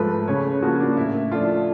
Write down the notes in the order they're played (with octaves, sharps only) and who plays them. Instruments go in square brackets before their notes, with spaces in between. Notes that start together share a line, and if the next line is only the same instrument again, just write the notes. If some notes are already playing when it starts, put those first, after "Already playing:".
Already playing: [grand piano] G#2 F3 A3 [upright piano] B4
[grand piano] C#3 [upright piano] C#5
[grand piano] F3 A#3 [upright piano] F#4
[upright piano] D4
[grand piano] A2 [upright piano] E4
[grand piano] F3 A3 D4 [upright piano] F4